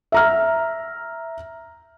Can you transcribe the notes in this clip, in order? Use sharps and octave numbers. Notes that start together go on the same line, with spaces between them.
E5 A#5 F6